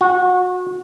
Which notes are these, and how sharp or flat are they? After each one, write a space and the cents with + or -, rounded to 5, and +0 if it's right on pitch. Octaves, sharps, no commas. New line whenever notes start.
F#4 -30